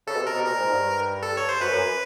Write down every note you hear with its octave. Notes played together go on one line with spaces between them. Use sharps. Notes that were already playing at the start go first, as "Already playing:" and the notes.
C#3 A4
B2
C3
A#4
B2
A#2 A#4
G#2
G2
A4
C#5
C5
F#2 B4
F#2